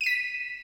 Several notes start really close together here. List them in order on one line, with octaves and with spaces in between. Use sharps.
D#7 E7 B6